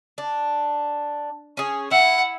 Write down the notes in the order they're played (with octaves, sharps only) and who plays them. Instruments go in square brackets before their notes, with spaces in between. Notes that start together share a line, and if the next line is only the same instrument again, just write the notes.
[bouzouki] D4
C#4 G#4
[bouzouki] E4 [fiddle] F#5